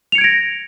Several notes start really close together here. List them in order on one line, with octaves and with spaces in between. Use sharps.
F7 C#7 G#6 D7 A#6